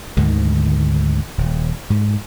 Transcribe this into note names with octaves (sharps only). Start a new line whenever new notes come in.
D2 G#2 D3 D#3
D#1
G#2